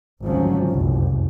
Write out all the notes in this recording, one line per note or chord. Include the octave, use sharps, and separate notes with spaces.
G#1 D2 C#3 F3 F#3 C#4
F#1 C2 F2 A2